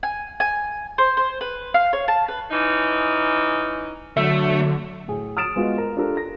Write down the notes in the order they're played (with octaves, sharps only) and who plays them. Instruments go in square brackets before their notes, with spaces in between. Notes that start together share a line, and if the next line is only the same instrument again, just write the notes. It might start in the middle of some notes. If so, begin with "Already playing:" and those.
[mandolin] G#5
G#5
C5
C5
B4
F5
C#5
A5
B4
[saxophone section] E3 C#4 D#4
[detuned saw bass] D3 [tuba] F#3 [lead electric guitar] A3 [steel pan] E5
[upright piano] A2 G#4
D#6 F6 A6 D7 E7
G#3 B3 F4 F#4 D#5
A#4
D4 F4 G4 A4 A#4
A#6